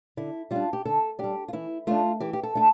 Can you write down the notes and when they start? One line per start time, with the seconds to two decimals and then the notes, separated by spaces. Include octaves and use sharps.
0.17 D3 E4
0.51 G3 D4 F4
0.73 G4
0.85 D3 A4
1.19 G3 D4 G4
1.48 F4
1.53 E3 E4
1.87 A3 D4 F4
2.20 E3 G4
2.33 G4
2.43 A4
2.55 A3 D4 A4